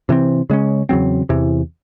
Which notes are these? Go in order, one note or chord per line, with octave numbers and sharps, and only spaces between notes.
C3 E3 C4
C#3 G#3 C#4
E2 C#3 F#3 C4
E2 C3 E3